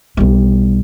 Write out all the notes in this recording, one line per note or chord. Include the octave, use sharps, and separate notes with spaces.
B1 G3